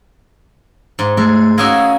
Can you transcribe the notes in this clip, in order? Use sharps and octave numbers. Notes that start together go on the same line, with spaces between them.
G#2
G#3 A3
A#3 C#4 F#4 D#6 E6 G#6